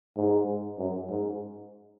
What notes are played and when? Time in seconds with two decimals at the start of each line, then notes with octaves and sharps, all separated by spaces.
0.17 G#2
0.78 F#2
1.10 G#2